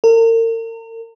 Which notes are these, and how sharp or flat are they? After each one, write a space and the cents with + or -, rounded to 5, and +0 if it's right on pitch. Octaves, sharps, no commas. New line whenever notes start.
A#4 -40